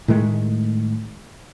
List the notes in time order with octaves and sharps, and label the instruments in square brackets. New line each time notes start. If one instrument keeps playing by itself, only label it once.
[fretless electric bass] A2 D#3 G#3 A3